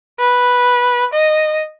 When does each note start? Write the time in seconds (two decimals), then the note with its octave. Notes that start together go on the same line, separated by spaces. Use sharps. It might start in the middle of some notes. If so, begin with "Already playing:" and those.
0.19 B4
1.14 D#5